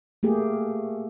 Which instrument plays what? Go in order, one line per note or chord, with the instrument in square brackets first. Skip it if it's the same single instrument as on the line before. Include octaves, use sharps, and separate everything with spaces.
[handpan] A3 A#3 G4 G#4